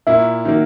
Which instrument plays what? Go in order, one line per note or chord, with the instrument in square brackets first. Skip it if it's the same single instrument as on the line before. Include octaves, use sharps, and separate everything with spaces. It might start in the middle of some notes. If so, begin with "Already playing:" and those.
[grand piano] A#2 A#3 E4 [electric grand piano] E5
[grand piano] D#3 F#3 A#3